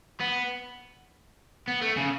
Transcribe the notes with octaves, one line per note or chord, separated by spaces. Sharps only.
B3
B3
A3
C#3